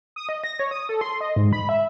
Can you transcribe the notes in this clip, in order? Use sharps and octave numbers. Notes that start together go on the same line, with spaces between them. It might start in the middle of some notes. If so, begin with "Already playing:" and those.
D#6
D#5
A#6
C#5
D#6
A4
C6
D#5
G#2
B5
E5